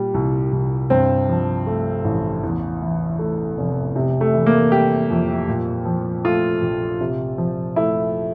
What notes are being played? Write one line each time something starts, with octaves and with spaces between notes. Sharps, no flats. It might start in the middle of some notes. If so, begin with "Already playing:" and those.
Already playing: A#2 G3
C2
C2
G2 C4
F3
A3
A1
E2
E3
A3
F1
C3
A3
E3
A#3
G3 G4
F2
A#2
F3
A3 F4
A#1
C3
F3
A3 E4